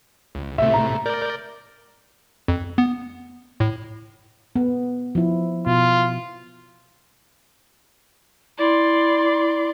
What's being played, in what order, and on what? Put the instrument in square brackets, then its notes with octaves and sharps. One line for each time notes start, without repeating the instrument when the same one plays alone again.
[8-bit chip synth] C#2
[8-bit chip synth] A2 C3 A3 [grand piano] E5
[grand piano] A#5
[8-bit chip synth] A#4 D5 G6
F2
B3
A2
[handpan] B3
F3 E4
[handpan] B2 [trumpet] F4
[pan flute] E4 [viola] D5 C6